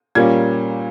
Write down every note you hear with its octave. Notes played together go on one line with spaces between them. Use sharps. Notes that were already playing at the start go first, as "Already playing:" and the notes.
A#2 G3 A#3 C#4 G#6